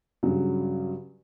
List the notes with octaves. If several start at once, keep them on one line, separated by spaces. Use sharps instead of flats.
G2 C#3 F#3